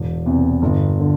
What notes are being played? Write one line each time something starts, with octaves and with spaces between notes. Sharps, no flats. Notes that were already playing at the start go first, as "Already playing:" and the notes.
Already playing: E1
E2 C3
G1
D3